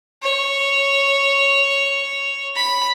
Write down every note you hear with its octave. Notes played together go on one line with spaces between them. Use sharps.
C#5
B5